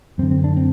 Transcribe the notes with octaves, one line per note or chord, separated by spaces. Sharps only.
F#2 D3 C4
C4
D4
C4